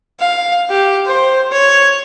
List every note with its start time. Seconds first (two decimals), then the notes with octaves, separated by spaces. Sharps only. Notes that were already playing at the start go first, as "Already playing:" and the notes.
0.20 F5
0.69 G4
1.07 C5
1.52 C#5